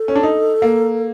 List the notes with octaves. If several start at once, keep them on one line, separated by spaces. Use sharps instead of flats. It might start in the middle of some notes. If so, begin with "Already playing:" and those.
Already playing: A4
C#4
D4
D#4
A#3